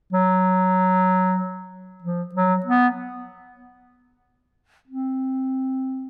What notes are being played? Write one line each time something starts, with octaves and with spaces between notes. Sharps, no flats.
F#3
F3
F#3
B3
C4